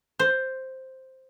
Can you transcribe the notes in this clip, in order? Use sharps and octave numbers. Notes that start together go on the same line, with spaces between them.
C5